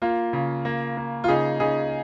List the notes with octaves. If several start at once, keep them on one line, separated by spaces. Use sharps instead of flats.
A#3 F4
C#3
A#3
A#3
F4
C#3 D#4 G#4
C#3 D#4 G#4